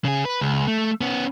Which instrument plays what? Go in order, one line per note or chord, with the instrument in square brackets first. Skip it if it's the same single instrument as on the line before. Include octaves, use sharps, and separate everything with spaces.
[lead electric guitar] C#3 G#4
B4
C#2
A3
B3 C#4